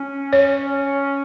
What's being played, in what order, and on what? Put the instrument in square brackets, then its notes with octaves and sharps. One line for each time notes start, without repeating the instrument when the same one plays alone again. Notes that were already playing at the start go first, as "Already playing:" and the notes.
Already playing: [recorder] C#4
[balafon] C#5